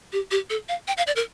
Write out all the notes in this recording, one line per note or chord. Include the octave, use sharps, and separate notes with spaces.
G4
G4
A4
F5
G5
F5
D5
A#4